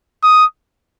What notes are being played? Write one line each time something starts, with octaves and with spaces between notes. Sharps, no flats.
D#6